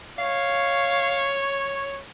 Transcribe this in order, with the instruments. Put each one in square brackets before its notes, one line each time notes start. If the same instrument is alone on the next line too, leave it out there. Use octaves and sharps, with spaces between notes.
[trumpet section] C#5 [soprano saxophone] F5